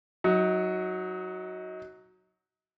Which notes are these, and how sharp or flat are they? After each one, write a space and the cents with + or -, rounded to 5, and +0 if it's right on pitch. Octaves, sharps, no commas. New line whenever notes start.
F#3 +0 D#4 +30